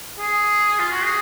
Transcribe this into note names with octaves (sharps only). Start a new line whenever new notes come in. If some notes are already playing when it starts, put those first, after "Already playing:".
G#4
F4
F#4
G#4